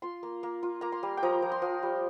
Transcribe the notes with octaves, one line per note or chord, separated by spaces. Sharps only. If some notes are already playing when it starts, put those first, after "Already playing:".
F4 C6
A#3
A#3
F4
A#3 A#5
C6
G3
G5
F3 A#5
F3
C6
F3
G3